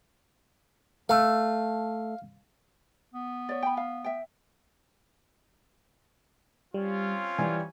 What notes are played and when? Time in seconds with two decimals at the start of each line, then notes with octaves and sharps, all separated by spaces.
1.09 A3 F5
3.14 B3
3.49 C#5 D5
3.62 G5 B5
3.77 F5
4.04 E5 G5
6.74 G3 C4 C#4 F4
7.39 E3 G3 G#5